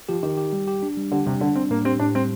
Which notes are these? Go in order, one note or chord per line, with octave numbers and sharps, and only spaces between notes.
F3 G4
D#3 G4
G4
G3
G4
D4
G3
D3 G4
C3 G3
D3 D4
C4 D4
A2 A#3
C4 G4
A2 D4
G3 C4